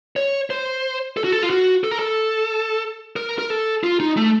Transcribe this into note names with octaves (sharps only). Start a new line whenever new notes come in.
C#5
C5
A4
F#4
A4
F4
F#4
A4
A#4
A4
A#4
A#4
A4
F4
D#4
A3